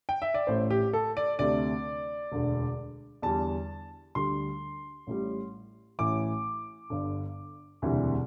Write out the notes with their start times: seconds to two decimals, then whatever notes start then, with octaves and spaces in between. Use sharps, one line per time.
0.09 G5
0.22 E5
0.34 D5
0.47 A1 A2 A3 C5
0.70 G4
0.93 A4
1.17 D5
1.39 D2 C3 A3 D5
2.31 E1 D2 D3
3.22 E2 D3 G3 A5
4.15 D2 D3 G3 C6
5.07 A1 A2 G3
5.99 A1 A2 E3 D6
6.90 G1 G2 D3
7.82 E1 D2 C3 E3 G3